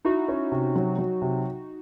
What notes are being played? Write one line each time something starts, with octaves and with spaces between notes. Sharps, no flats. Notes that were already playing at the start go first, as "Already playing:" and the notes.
D#4 E4 F#4
C#4
C3
F#3
F#3
C3